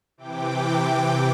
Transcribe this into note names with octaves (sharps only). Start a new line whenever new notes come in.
C3 E3 G5 D6